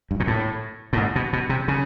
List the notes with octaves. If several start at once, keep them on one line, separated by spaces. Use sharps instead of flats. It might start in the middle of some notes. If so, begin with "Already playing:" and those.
G2
A#2
A2
A2
G#2
B2
B2
C3
C#3